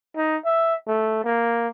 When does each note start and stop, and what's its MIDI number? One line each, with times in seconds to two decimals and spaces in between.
0.17 0.37 63
0.45 0.76 76
0.87 1.20 57
1.24 1.68 58